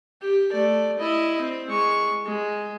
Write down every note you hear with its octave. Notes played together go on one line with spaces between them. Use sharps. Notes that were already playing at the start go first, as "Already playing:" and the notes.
G4
A3 D5
E4 D#5
C4
G#3 C#6
G#3